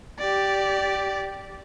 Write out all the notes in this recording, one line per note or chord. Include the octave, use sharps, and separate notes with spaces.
G4 D5